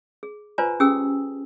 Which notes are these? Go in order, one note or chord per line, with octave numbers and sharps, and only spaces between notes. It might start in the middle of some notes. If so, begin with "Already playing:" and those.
G#4
F4 B4 C5 D5 G#5 A#5
C#4 G4 G#4 G5 D#6 E6